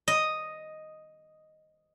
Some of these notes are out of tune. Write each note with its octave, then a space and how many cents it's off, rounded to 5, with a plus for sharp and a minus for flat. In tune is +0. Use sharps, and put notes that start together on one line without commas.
D#5 +0